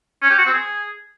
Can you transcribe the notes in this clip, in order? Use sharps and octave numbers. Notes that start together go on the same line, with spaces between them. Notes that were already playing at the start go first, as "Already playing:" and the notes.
C#4
G4
F#4
C4
G#4